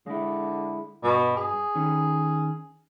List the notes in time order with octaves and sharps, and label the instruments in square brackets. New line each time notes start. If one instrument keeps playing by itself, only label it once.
[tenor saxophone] D3 [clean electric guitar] G#3 E4
[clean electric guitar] G2 [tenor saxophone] B2
[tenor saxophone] G#4
[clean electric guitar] D#3 C#4